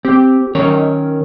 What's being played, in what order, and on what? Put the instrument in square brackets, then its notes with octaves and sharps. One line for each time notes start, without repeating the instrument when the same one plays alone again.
[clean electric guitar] C4 [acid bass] G4
[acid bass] D#3 [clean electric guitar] C#4 A#4 C#5